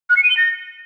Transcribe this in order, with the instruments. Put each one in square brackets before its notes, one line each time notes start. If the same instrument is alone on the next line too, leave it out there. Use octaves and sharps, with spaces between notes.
[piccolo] F#6
C#7
D#7
G7
A#6